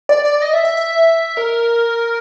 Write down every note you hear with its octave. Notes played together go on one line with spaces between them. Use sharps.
D5
D5
D#5
E5
E5
E5
A#4